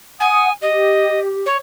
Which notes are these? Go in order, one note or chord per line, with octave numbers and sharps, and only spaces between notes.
F#5 G#5 D#6
G4 D#5
C#5